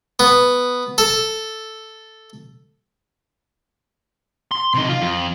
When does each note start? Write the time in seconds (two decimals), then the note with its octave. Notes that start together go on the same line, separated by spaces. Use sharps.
0.19 B3
0.98 A4
4.51 C6
4.74 C3 D#4
4.89 F4
5.02 F2